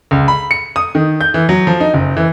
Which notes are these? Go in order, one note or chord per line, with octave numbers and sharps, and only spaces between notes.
C#2
B5
C#7
D#6
D#3
G6
E3
F#3
F3
D#4
F#1
E3